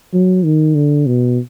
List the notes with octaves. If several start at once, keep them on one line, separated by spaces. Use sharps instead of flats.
F#3
D#3
D3
B2